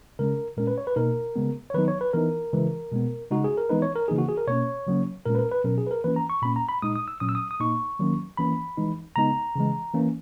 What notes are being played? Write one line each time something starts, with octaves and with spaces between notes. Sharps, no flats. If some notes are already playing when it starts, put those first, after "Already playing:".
C#3 G#3 C#4 A#4
A#2 G#3 C#4 A#4
B4
C#5
B4
B2 A#3 D#4 A#4
C#3 G#3 B3
C#5
D#3 F#3 B3 D#4 B4
C#5
B4
E3 B3 D#4 A#4
C#3 E3 G#3
B2 G#3 B3
C#3 G#3 D#4 F#4
G#4
A#4
E3 G#3 B3 D#4 B4
C#5
A#4
C#3 E3 A#3 D#4 G#4
F#4
G#4
A#4
B2 A#3 C#4 C#5
C#3 F#3 A#3 C#4
A#2 G#3 C#4 A#4
B4
A#4
B4
B2 F#3 C#4 A#4
G#4
B4
A#4
E3 A#3 C#4 B4
A#5
C#6
A#2 A#3 C#4 B5
A#5
B5
A#2 G#3 D#4 D#6
D#6
E6
A#2 F#3 C#4 D#6
E6
D#6
D#6
A#2 A#3 D#4 C#6
D#3 F#3 A#3 C#4
E3 A#3 C#4 B5
E3 G#3 D#4
C#3 G#3 B3 D#4 A#5
C#3 E3 G#3
E3 A#3 C#4